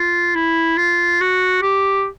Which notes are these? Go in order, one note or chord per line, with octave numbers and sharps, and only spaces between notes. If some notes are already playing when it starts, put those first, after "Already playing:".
Already playing: F4
E4
F4
F#4
G4